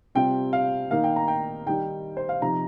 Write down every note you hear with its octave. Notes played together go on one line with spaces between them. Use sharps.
C3 G3 C4 F4 G5
F5
D#3 A#3 D#4 F5
G5
A#5
G5
D#3 G3 D#4 G5
C5
F5
C3 F3 D#4 A#5